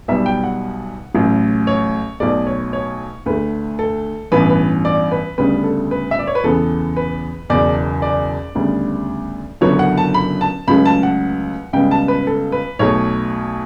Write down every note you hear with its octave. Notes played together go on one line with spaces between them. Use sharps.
B1 B2 G3 B3 E5
G5
F#5
A1 A2 F#3
C#5
B1 B2 A3 D5
C#5
C#5
D2 D3 A3 B4
A4
A1 G2 E3 B3 B4
B4
D5
B4
D2 C#3 G3 B3 B4
A4
B4
E5
D5
C#5
B4
E2 C#3 E3 B3 A4
B4
F#1 E2 B2 D5
D5
D2 C#3 G3 B3
F#1 F#2 D3 F#3 B3 C#5
F#5
A5
B5
A5
C#2 C#3 F#3 A3 B5
A5
F#5
C#2 C#3 G3 B3 G5
A5
B4
A4
B4
B1 B2 A3 C#5